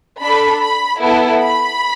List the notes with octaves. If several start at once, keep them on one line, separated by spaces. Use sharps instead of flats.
D4 A4 B5
B5
B3 E4 A4
B5